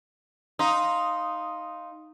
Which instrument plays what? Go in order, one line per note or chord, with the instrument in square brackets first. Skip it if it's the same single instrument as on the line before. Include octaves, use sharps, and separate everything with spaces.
[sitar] D#4 [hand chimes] F5 C6 D#6